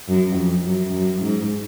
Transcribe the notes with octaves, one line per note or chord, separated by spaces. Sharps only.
F#2
F2
F#2
F#2
G#2